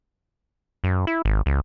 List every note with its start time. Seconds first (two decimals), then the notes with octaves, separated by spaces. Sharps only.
0.84 F#2
1.07 E4
1.25 G#1
1.46 C#2